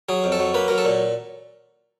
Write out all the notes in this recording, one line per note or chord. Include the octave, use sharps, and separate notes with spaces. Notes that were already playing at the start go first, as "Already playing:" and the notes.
F#3 G#4
F2
A4
F#3
A#3 B4
F#3 A#4
A4
A#2